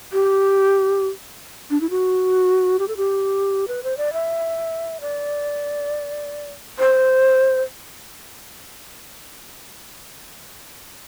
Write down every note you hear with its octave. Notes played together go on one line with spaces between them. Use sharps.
G4
D4
E4
F#4
G4
A4
G4
B4
C5
D5
E5
D5
C5